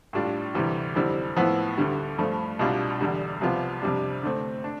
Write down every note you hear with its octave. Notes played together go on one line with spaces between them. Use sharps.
A2 G3 D4 F4
D2 C3 E3 G3
F2 D3 G3 C4 E4
A2 F3 B3 E4
D2 D3 G3
G2 F3 A3
C2 B2 G3 D4 F4
E2 D3 G3
C2 C3 F3 B3 F4
F2 C3 G3 D4
D3 A3 C4
D4